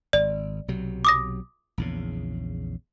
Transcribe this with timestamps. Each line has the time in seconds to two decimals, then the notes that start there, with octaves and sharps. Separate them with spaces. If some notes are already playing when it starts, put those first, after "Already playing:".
0.13 G#1 D5
0.68 B1 C3 F#3
1.05 D6 D#6 A#6
1.78 A#1 E2 C#3